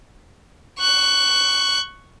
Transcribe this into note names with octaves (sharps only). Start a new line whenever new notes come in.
C#6 F#6